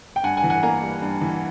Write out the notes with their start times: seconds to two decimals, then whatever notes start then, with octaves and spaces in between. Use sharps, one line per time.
0.16 G5
0.24 G2 F#5 G#5
0.37 F#5 G#5
0.43 E3
0.50 F#5 G#5
0.63 A#3 G#5 A#5
0.83 G3
1.02 G2
1.21 E3